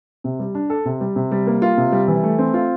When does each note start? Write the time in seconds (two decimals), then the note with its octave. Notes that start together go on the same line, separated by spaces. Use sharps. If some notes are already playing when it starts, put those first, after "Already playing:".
0.24 C3
0.39 G3
0.55 D4
0.70 A4
0.85 C3
1.01 G3
1.16 C3
1.31 G3
1.47 A#3
1.62 F4
1.77 C3
1.92 G3
2.08 E3
2.23 A3
2.39 C4
2.54 F4